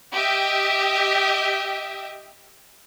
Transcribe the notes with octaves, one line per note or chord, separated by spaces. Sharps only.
G4 D#5 E5